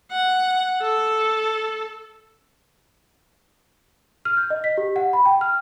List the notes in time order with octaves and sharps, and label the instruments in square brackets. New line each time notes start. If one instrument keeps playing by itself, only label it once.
[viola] F#5
A4
[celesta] F6
G6
D#5
B6
G4
F#5
B5
G5
F6